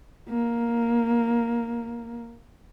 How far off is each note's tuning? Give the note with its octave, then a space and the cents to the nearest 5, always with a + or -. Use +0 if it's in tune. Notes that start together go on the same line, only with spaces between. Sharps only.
A#3 +5